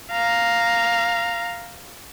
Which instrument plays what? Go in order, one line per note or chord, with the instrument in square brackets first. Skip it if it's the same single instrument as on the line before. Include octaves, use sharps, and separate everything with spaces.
[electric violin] F5 A#5